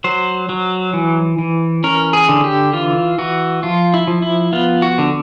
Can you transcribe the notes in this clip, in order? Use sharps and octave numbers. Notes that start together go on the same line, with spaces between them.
F#3 C5
F#3
E3
E3
C#4 A#4
G#4
D3
G4
E3 F4
E3 F#4
F3 F4
E4
F3
E4
B3 F4
F#4
D3